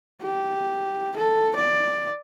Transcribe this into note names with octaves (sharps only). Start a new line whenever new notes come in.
G4
A4
D5